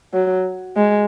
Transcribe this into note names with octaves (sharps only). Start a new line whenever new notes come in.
F#3
G#3